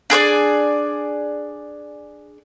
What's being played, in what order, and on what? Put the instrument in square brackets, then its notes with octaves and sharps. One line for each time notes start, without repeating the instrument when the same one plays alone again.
[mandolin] D4 G#4 C5 D5